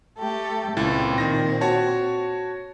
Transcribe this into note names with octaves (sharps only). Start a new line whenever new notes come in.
A3 G4 A4
C#2 A#2 C4 E4 A6
D#3 A#6
F#4 C#5 A5